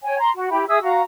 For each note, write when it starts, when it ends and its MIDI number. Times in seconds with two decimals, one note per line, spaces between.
0.04 0.19 73
0.04 0.19 79
0.04 0.19 80
0.19 0.31 82
0.19 0.31 84
0.34 0.48 66
0.51 0.64 64
0.51 0.64 67
0.51 0.64 76
0.51 0.64 83
0.67 0.79 68
0.67 0.79 76
0.67 0.79 87
0.67 0.79 88
0.83 1.01 66
0.83 1.01 77
0.83 1.01 82